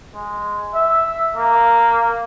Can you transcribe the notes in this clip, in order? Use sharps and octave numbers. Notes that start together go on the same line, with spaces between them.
G#3
E5
A#3